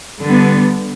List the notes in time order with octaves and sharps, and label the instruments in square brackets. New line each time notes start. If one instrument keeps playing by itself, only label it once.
[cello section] D3 G3 B3